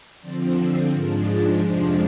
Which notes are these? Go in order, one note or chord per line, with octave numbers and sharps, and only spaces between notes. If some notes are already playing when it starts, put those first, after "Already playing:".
D3 F3 C4 D5
G#2 F3 G#3 D4 A#4
D5
F2 C3 F3 G#3 D4 C5